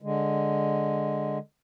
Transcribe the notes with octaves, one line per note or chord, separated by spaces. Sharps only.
D3 G#3